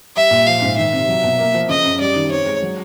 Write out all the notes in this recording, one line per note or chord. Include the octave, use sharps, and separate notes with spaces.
G3 E5
A#2
F3 F5
G#2
D#3 E5
C3
F#3
B2
A#3
F3
C#3 D#5
F#2
G3 D5
D#3
C4 C#5
G#3
F#3